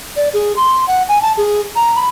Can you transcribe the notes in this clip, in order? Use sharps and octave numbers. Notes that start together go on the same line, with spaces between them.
D5
G#4
C6
F#5
G#5
A5
G#4
A#5
B5